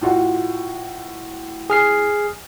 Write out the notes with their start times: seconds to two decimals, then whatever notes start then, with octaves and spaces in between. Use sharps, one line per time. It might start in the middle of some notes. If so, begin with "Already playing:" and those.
0.01 A2 F4 F#4
1.70 G#4 F6 C7